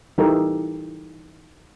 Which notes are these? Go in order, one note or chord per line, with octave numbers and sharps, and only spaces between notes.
E3 G3 D#4 G4 A4 A#4